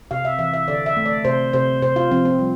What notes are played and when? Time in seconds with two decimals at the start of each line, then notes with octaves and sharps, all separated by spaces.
0.11 C3 F5
0.25 E5
0.39 E3 E5
0.54 E5
0.68 D3 D5
0.86 E5
0.97 A3
1.06 D5
1.25 C3 C5
1.53 C3 C5
1.82 C3 C5
1.96 F4
2.11 F3 C4
2.25 C4
2.39 G3